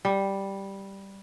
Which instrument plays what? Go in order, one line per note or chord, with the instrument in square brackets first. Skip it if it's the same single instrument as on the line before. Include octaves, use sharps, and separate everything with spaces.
[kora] G3